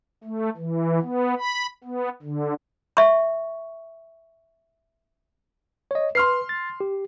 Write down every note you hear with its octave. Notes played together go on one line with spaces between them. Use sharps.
A3
E3
B3
B5
B3
D3
E5 C#6
C#5 D#5
B4 C6 F6 C7
A6
G4